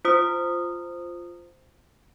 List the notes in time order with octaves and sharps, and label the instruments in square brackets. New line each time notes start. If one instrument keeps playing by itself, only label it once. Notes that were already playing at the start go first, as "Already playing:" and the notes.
[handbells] F4 C5 D#6